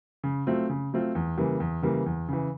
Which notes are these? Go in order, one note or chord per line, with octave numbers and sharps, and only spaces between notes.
C#3
F#3 A3 C4 F4
C#3
F#3 A3 C4 F4
E2
C#3 E3 G3 A#3
E2
C#3 E3 G3 A#3
E2
C#3 E3